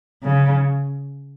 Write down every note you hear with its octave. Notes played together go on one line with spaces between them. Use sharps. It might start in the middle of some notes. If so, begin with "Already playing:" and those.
C#3